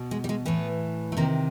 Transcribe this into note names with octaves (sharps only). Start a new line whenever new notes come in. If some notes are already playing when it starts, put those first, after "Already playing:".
Already playing: B2
G#3
G3
G#3
A2 E3 B3
A3
C3 D#3 A#3